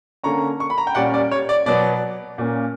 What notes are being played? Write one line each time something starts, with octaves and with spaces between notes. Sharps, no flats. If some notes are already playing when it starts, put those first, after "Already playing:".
D3 A#3 C#4 A#5 C#6
C#6
B5
A#5
G5
A#2 G3 C#4 D5 F#5
D5
C#5
D5
B2 F#3 B3 D5
A#2 A#3 C#4